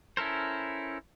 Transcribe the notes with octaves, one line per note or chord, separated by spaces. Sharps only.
C#4 E4 A4 A#4 C5